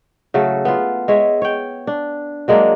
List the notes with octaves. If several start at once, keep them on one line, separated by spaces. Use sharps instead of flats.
C#3 F#3 A3 A4
B3 F4
G#3 C#5 E5
C#5 G5
D4
F#3 G#3 A#3 D4